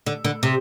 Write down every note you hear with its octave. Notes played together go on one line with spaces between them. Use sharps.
D3
D3
C3